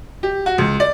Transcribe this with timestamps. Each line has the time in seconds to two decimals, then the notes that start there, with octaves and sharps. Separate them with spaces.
0.23 G4
0.46 F#4
0.58 C#2
0.80 D5